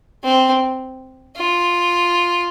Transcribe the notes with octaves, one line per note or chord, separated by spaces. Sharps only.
C4
F4